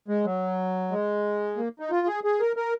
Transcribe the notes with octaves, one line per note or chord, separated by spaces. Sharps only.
G#3
F#3
G#3
A#3
D#4
F4
G#4
G#4
A#4
A#4